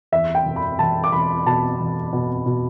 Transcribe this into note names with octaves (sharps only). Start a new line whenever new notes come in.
E2 E5
G5
E1
B5
E1 A5
D6
E1 B5
B2 A5
E1
B2
B2